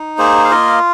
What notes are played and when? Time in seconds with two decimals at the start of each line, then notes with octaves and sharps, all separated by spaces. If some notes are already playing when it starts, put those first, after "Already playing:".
Already playing: D#4
0.18 A#3 G#4 C5
0.44 F5
0.50 F4 A#4 D#5